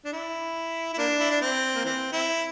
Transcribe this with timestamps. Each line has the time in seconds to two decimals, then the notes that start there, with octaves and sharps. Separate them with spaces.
0.05 D4
0.13 E4
0.93 E4
0.98 A#3 D4
1.19 E4
1.30 D4
1.41 C4
1.75 A#3
1.85 E3 C4
2.12 C4 E4